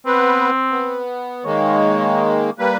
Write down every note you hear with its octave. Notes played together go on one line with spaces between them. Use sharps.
B3 C4 B4
B3
D#3 G#3 A#3 C#5
G3 A#3 B4